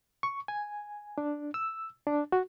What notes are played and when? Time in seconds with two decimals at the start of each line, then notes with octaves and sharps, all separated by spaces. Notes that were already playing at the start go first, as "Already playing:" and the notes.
0.23 C#6
0.48 G#5
1.18 D4
1.54 E6
2.07 D4
2.32 F#4